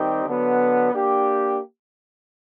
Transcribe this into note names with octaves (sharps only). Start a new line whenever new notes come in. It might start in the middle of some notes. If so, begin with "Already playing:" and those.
Already playing: D#3 G3 C4 D#4 G4
D3 F#3 B3
A#3 D4 G4